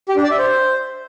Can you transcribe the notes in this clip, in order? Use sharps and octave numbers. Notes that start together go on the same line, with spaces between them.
G4
D4
D5
E5
C5